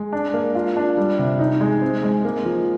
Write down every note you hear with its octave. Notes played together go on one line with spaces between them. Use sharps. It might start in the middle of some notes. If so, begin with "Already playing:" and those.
Already playing: G#3
D4
A#3
F4
D4
G3
C3
D#4
G#3
C4
G#3
A#3
F3